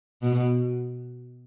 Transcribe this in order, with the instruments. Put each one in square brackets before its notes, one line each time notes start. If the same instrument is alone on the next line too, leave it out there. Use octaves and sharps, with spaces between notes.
[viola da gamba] B2